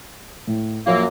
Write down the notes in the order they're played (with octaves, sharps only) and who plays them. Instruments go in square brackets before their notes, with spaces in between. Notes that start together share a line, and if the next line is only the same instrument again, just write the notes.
[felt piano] A2
[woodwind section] F#2 F#3 A#3 [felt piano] F3 E6